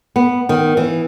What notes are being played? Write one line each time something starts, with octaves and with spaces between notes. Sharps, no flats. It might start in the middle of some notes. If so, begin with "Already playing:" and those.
B3
D#3
E3